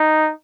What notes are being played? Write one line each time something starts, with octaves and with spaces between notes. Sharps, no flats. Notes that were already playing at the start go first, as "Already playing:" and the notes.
Already playing: D#4